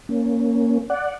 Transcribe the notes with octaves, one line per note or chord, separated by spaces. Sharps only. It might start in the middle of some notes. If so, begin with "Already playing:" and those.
A#3 C#4
D5 F#5